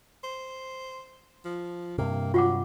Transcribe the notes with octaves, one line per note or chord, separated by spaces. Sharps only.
C5
F3
G2 C3 A#3
F#3 F4 F#5 D6